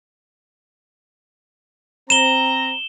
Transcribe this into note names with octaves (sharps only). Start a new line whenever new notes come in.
C4 A#5 E7 G7